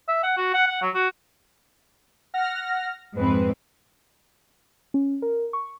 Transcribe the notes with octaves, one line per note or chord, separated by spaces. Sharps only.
E5
F#5
F#4
F#5
F#5
F#3
F#4
F#5 F6 A#6
F2 G#2 C4 B4
C#4
A#4
C#6